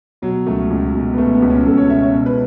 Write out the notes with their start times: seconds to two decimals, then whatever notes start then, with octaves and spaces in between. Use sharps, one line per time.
0.22 B2 F#3
0.46 C#2 A3
0.70 C#2
0.94 B2
1.14 B3
1.18 B2 A3
1.34 B3
1.42 C#2
1.50 C#4
1.66 C#2 A4
1.77 C#5
1.89 B2 E5
2.02 C#5
2.14 B2
2.26 B4